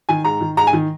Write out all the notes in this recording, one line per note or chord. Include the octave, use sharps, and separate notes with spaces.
D#3 G#5
G#2 A#5
D#3
G#2 A#5
G#5
D#3